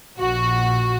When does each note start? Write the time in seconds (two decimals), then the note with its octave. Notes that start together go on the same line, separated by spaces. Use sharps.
0.18 A#1 F#4